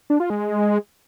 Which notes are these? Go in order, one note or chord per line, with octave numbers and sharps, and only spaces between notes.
D4
F4
G#3